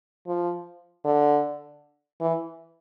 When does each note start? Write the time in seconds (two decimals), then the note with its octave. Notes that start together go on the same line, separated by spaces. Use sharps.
0.27 F3
1.05 D3
2.21 E3